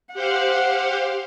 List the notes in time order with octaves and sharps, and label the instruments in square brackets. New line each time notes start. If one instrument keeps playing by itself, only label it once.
[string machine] G4 C5 F5 [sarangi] F#5